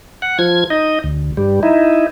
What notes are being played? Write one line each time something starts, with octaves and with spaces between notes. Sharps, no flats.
F#5
F3 G#6
D#4 D#5
D2
G2 G3
D#4 E4